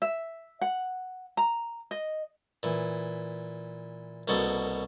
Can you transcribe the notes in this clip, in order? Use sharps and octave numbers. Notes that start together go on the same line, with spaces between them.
E5
F#5
A#5
D#5
A#2 E3
C2 B2 A#3 F#4 A4 C6